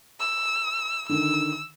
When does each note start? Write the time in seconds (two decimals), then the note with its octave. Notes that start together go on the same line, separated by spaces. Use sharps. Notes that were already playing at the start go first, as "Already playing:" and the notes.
0.20 E6
1.09 D3 D#3 E6